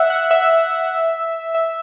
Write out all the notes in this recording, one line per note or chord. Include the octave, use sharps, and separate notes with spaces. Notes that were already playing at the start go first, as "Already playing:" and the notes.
Already playing: E5 F#5
F#5
E5
E5